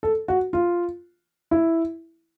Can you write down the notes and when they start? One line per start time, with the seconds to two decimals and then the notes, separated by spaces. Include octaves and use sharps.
0.03 A4
0.28 F#4
0.53 F4
1.51 E4